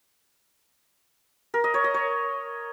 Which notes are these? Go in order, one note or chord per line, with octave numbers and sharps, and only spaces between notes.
A#4
D#5
C#5
D#5
C#5